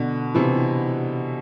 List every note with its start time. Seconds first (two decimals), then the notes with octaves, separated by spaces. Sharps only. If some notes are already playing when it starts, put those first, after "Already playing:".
Already playing: B2 D3
0.35 C3 E3